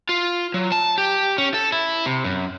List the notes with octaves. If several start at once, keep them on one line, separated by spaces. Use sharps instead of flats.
F4
F#3
A5
G4
C#4
A4
E4
C3
F#2